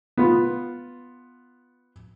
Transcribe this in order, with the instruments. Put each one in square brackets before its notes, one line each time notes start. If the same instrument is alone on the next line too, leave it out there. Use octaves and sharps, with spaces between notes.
[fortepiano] B3 F4